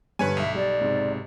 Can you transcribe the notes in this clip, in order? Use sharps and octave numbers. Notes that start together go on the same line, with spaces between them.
G2 D3 B4 C#5 G#5
B1 E5
G3 D5
G#2 C3